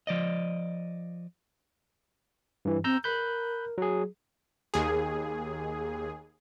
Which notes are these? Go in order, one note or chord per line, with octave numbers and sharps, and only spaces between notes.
F3 D5 D#5
G2 E3
C4 A#5 E6 G6
A#4 B5 F#6 G6
F#3 G#4
D#2 G#4